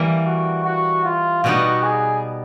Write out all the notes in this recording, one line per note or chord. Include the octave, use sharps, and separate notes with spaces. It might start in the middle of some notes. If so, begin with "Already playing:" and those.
Already playing: E3 G3 A#3
F#4
F#4
F4
B2 G3 B3 D#4 F#4
G#4